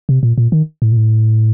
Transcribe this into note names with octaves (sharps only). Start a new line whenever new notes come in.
C3
A#2
A#2
D#3
A2
A#2
A2